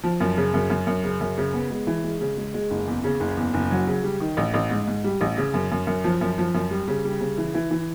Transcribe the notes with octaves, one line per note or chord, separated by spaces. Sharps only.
F3
F#2
C#3
F#2
F#2
F#2
C#3
F#2
C#3
B3
G#3
E3
G#3
C#3
G#3
G#3
F#1
E2
C#3
F#1
E2
F#1
F#3
C#3
G3
D#3
A1
A1
G#2
G#2
G3
A1
C#3
F#2
F#2
F#2
F3
F#2
F3
F#2
G3
C#3
G3
C#3
E3
E3
E3